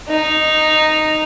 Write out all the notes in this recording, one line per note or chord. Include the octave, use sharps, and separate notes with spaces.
D#4